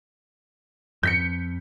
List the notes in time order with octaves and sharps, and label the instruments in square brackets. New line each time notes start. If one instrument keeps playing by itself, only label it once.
[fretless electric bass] F2 [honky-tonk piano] G6 B6 C#7